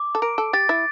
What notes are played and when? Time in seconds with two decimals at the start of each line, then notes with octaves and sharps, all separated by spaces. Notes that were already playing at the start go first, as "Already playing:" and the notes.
Already playing: D6
0.15 A4
0.22 A#4 D7
0.38 A4
0.53 G4 A6
0.69 E4